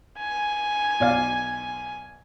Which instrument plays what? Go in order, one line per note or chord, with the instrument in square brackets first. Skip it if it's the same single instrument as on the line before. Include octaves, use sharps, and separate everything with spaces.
[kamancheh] G#5
[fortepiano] B1 D5 F5